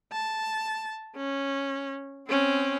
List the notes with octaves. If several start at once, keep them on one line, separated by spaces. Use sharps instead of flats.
A5
C#4
C4 C#4